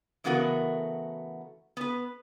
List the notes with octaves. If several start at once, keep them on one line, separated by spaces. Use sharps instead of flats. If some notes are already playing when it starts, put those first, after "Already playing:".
C#3 E3 A3 B3 F#4 A#4
B3 B4